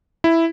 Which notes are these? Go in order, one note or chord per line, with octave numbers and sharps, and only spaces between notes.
E4